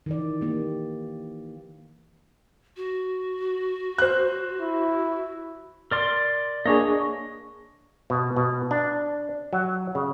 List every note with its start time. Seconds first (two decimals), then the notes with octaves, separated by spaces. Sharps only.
0.06 D#3 E3 D5
0.41 A#3 G4
2.77 F#4
3.98 C5 F#6
4.61 E4
5.91 A#4 D5 C6
6.66 A#3 D4 G#4 C#5 D#5
8.10 B2
8.36 B2
8.71 D4
9.53 F#3
9.95 C#3